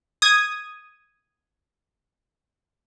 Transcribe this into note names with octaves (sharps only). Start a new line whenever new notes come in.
D#6 G#6